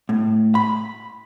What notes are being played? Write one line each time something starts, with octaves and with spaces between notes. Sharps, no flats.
A2
B5